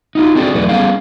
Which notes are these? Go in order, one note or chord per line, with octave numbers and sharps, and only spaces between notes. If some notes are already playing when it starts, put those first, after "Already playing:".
D#4 F4 F#4
A3 C4 D4 F#4 G#4 A4
E2 F#3 A3 B4 D5
G3 B3 C#4 G#4 A4 F5